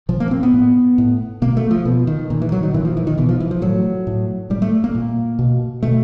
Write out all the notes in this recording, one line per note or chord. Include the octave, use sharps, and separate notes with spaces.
A#2 F3
A#3
C4
B3
A2
A2
B2 A#3
A3
F3
B2
D#3
A#2
E3
F#3
D#3
A#2 E3
F3
E3
D#3
B2 E3
F3
E3
F3
A2 F#3
A2
A2 G3
A3
A#3
A#2
B2
B2 A3